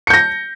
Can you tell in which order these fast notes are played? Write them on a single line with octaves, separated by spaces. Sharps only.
C#7 G6 A#6